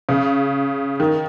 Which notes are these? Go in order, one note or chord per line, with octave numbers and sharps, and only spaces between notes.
C#3
D#3